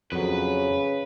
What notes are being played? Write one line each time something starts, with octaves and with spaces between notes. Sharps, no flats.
F2 C#3 F#3 B4